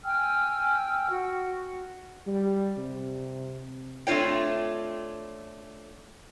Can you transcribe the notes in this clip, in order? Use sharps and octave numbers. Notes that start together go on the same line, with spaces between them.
G5 G#5 E6 F6
F#4
G3
C3
A3 C4 D4 F4 C#5 G5